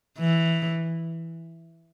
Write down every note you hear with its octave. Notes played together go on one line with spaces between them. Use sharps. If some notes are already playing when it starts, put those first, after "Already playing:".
E3